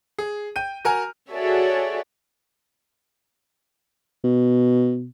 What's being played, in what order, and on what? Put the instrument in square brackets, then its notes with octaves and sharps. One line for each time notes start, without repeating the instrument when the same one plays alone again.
[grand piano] G#4
G5 G6 D#7
F#4 A#4 G#5 F6
[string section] F#4 G#4 A4 C#5 D5 E5
[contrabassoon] B2